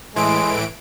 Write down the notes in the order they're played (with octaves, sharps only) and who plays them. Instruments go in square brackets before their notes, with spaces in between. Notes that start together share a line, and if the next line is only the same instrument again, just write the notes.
[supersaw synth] A2 E3 D7 [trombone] G#3